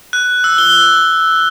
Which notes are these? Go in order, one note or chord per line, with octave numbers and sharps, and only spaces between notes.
F#6
E6
G7